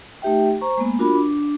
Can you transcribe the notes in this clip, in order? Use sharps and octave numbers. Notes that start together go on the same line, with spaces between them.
A3 D#4 G4 E5 G5
C5 A#5 C#6
G#3 A#3 B3
D4 F4 F#4 A#4 B5
D4